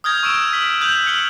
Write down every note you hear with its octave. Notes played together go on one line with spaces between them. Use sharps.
D#6 F6 G6 G#6 A#6
C#6 E6 D7 E7 G7
B6 F#7 G7
D#6 F#6 G6 F7 F#7
F6 C#7 E7 F#7 G7